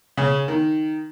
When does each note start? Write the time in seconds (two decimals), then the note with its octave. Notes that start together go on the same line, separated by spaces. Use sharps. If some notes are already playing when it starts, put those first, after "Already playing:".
0.17 C#3
0.48 D#3